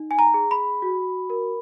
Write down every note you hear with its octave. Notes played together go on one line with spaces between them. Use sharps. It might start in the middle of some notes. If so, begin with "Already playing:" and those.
Already playing: D#4
G#5
A#5
G#4
B5
F#4
A#4